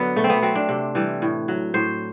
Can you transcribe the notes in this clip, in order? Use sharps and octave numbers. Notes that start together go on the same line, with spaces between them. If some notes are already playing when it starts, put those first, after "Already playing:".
Already playing: D3 F#3 B3
B2 A3
C4
B3
F#3 C4
D4
C3
E3 G3
A2
F#3
A2 C5